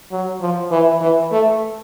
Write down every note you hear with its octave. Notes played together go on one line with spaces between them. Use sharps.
F#3
F3
E3
E3
A3